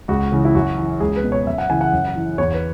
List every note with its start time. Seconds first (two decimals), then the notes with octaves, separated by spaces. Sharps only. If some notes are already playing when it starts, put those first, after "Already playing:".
0.08 C#2 F#4
0.32 C#3 E3
0.45 E4
0.55 F#2 F#4
0.78 E3
1.00 C#2 G#4
1.16 B4
1.23 B2
1.32 C#5
1.46 F#2 E5
1.58 F#5
1.69 C#3 E3 G#5
1.81 F#5
1.92 F#2
2.16 E3
2.38 E2 C#5
2.54 B4